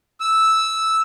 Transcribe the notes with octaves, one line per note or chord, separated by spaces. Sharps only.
E6